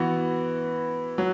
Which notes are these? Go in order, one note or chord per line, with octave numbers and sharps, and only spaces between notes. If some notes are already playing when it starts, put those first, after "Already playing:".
Already playing: E3 B3 F#4
F#3